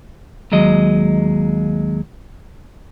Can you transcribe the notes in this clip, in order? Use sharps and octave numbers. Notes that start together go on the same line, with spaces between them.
D#2 F#3 G#3 D#5